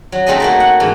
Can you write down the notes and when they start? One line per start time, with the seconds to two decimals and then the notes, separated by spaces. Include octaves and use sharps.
0.12 F#3
0.26 A3 C4 D#4 G#4 D#5
0.40 A3 A#3 F#4
0.60 F#5
0.80 G#2 E3